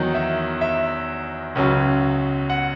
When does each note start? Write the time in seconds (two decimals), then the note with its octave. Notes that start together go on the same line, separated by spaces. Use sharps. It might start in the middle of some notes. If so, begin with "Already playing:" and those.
Already playing: E2 D#3 F#3 D#5
0.14 E5
0.61 E5
1.55 C#2 C#3 F#3
2.50 F#5